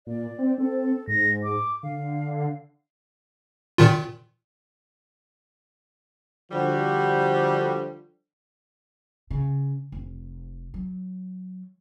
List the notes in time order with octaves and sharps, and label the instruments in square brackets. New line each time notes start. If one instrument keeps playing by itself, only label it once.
[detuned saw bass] A#2 [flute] D5
[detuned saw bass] C4
[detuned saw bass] C4 [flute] A4
[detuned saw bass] G#2 [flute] A#6
[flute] D6
[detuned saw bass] D3 [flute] F5
[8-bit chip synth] A#2 D#3 F4
[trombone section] D3 F3 [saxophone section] G3 [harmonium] F#4
[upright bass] C#3
F1
F#3